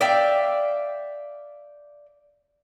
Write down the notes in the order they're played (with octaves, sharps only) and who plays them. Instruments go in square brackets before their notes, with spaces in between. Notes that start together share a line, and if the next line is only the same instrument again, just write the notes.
[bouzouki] D5 E5 F5 G5